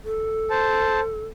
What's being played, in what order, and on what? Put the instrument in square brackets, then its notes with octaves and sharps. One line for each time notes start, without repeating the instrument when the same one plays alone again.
[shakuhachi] A4
[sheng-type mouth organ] C5 A5